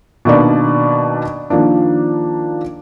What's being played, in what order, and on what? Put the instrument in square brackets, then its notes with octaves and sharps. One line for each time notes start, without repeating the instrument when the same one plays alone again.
[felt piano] B2 D#3 A#3 B3 D4 D5
D#3 F3 A#3 D4